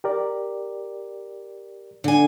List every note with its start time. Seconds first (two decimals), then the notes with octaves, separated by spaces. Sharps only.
0.04 G4 A#4 D5
2.04 D3 G#5